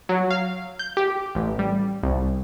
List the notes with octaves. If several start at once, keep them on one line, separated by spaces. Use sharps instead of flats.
F#3
F5
G6
G4
A1
G3
C2